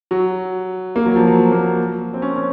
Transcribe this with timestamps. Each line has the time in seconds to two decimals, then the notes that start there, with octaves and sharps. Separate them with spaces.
0.11 F#3
0.96 A#3
1.06 F#3
1.16 F3
1.27 F#3
1.52 A#3
2.14 C4
2.22 C#4
2.36 C#4